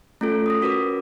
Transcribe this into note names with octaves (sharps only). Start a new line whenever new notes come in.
A3 C#4 F4 A4
D#6 A#6
C#4 F#4 A#4 B4 D6